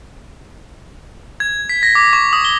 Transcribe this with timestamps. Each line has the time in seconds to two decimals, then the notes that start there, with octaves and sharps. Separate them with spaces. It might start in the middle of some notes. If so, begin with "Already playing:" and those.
1.40 G#6
1.69 B6
1.83 A#6
1.95 D6
2.13 C#6
2.33 D#6
2.45 G7